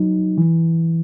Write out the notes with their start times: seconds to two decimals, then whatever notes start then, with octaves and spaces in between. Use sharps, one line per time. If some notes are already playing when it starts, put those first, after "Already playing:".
Already playing: F#3 D#4
0.38 E3